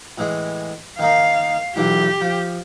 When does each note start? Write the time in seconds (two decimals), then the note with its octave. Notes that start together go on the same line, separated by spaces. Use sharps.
0.18 A2 E3 G#3
0.99 D#3 A#3 D#4 F5
1.76 B1 E3 F4 G4
2.21 F3